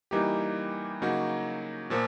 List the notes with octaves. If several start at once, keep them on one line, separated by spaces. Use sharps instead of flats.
E3 G3 A#3 D#4 G4
C#3 F#3 A#3 D#4 F#4
A#2 F3 A#3